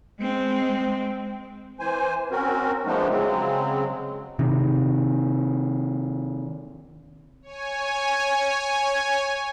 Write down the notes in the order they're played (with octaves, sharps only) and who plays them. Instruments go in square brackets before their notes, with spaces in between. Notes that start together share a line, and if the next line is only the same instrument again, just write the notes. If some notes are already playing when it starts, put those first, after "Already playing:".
[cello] G#3 C4
[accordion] E3 C5 G#5
C4 C#4 F#4 A#4
F3 G#3 A3 B3 D4 D#4
C#3 F#3 G#3 C4
[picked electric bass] C3 D#3
[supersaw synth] C#5 G#5